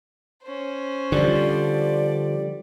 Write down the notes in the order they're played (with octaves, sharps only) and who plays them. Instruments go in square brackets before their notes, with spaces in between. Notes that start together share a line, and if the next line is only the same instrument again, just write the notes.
[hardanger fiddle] C#4 C5
[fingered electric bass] D3 F3 [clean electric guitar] G3 [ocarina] D5